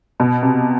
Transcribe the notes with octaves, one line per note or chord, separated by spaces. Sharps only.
B2
C3